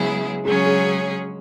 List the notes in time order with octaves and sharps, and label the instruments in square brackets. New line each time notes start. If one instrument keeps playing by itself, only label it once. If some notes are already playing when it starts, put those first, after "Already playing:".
Already playing: [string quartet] C#3 F#3 B3 E4 G#4 [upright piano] G#3
[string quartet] C#3 F#3 C#4 G#4 C#5 [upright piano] G#3
[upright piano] G#3